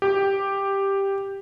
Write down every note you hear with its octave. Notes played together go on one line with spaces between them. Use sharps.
G4 D6